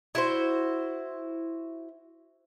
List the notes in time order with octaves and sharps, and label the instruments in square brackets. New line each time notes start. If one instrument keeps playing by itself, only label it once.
[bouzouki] E4 F#4 C5